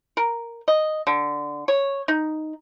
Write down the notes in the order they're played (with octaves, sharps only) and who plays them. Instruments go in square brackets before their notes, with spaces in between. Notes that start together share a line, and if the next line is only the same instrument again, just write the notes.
[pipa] A#4
D#5
D3
C#5
D#4